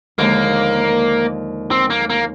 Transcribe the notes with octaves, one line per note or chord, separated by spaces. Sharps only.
D#2 D3 F3 G#3 A#3 D#4
C4
A#3
A#3